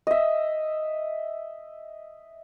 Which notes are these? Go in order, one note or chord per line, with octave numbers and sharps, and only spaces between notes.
D#5 E5